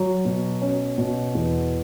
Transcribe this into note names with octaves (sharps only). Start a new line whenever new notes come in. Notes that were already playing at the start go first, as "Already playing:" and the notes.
Already playing: F#3
B2
C#4
B2
E2